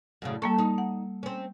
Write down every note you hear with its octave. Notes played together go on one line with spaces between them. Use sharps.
F#2 A2 C#3
G3 A#3 A4 C#6
D#4
F#5
C4 C#4